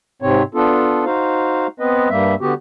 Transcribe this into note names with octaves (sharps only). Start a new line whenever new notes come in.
G#2 C3 C4 C#5
B3 D4 F4 A4
D#4 F#4 C5 F5
B3 C4 B4 D#5
G2 G3 A#3 E5
D3 B3 F#4 G4